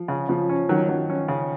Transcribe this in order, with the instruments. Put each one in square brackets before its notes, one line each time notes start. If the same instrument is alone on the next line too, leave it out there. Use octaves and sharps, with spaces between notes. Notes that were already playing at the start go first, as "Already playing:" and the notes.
Already playing: [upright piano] F3
[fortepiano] C#3
[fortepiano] C#3 [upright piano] F3
[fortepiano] C#4
[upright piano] D#3 [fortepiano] F#3
[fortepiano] F#3
C#4
C#3